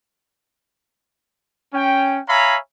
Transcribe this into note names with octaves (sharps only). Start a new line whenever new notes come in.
C#4 G5
C#5 E5 F5 G#5 A#5 B5